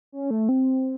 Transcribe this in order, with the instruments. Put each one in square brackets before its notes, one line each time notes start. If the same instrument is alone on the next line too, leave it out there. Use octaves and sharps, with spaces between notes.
[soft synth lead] C#4
A3
C4